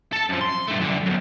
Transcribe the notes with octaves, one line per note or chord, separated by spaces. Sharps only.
A4 A5
F#2 F3
C6
G2 A3
F#2 D3
B1 F#2